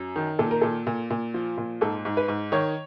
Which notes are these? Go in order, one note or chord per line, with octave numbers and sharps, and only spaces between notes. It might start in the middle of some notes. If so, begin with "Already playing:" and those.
Already playing: F#2
D#3
A#2 A4
A#4
A#2 A4
A#2
A#2
F3
A#2
G#2 A4
G#2
B4
G#2
D#3 C#5